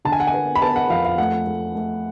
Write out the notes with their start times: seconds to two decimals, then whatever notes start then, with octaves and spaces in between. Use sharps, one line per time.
0.05 D3 A5
0.12 G#5
0.20 F#5
0.27 G#5
0.33 B3
0.55 B5
0.62 B3 A5
0.76 F#5
0.90 F2 F5
1.04 F5
1.18 A3 F#5
1.47 A3
1.75 A3